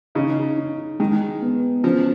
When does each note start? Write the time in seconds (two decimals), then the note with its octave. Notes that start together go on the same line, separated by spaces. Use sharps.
0.15 C#3 D#4
0.58 D#4
1.00 D#3 G#3
1.42 B3
1.84 F3 C#4